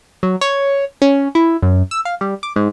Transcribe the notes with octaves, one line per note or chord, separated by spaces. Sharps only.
F#3
C#5
C#4
E4
F#2
E6
F5
G3
D6
G#2